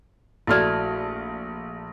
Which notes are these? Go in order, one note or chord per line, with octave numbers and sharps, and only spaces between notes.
A#1 A3 E4 F#4 D5 F6